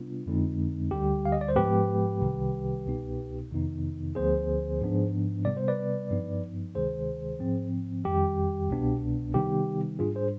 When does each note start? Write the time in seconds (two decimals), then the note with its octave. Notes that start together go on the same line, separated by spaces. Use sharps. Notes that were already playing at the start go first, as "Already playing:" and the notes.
Already playing: C3 G3 B3 D4 F4
0.26 F2 D3 G#3 C4 D#4
0.91 D2 D3 G3 G4
1.25 F5
1.32 D#5
1.41 D5
1.48 C5
1.56 G#2 F3 G#3 B3 G4 B4
2.21 C2 C3 D#3 G3
2.86 C2 B2 B3 D#4
3.51 F2 C3 D#3 B3 D#4
4.15 D2 D3 F3 B3 G#4 C5
4.81 G#2 F3 B3 D4
5.45 C3 G3 B3 D5
5.57 C5
5.68 B4 D5
6.11 G2 F3 B3 D#4
6.75 D2 C3 D#3 G#3 G#4 C5
7.39 G#2 F3 C4
8.04 F2 D#3 G3 G4
8.69 C2 B2 B3 D4
9.34 C3 D#3 G3 B3 D#4 G4
9.99 G#2 G3 D4 F4 G#4
10.15 G#4 C5